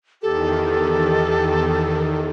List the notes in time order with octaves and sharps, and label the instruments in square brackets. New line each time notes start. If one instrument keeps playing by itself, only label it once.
[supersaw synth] E2 D#3 [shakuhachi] G4 [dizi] A4